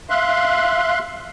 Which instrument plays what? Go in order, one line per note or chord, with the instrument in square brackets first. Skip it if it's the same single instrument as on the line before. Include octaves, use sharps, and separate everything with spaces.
[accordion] E5 F5 C6 F#6